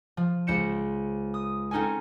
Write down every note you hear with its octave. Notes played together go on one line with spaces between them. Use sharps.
F3
C#2 C5 C#7 E7
D#6
C4 C#4 D#4 A4 A#4 G#5